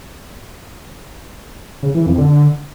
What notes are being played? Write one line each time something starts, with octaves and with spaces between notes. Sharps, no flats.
C#3
E3
F2
D3